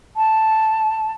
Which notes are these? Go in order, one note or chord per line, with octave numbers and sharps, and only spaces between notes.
A5